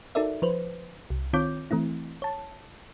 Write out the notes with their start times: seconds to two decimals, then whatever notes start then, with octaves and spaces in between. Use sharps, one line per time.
0.15 D#4 F#4 A4 A#4 D5 E5
0.42 F3 B4 C5
1.10 C2
1.33 D#3 C4 F4 C#5 D6 G6
1.71 E3 A3 C4 E4
2.22 C#5 A5